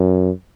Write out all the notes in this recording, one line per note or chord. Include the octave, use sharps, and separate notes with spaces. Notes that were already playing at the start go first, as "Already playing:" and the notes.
Already playing: F#2